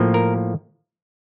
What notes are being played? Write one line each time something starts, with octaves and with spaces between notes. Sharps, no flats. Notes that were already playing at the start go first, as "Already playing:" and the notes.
Already playing: A2 F3 A#3
A#4